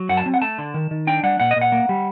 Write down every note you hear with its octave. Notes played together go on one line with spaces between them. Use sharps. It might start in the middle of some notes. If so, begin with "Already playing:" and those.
Already playing: F#3
F#2 F#5
A5
C4
F#5
A3 A5
D3
D#3
D#3
D4 G5
G3 F#5
A#2 F#5
D#5
A#2
F#5
A#3
G3